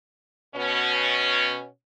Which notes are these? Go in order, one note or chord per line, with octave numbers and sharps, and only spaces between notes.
B2 C#4